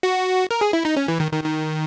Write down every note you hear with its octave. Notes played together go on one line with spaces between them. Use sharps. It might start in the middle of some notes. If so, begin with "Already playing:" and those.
F#4
A#4
G#4
E4
D#4
C#4
E3
D#3
D#3
D#3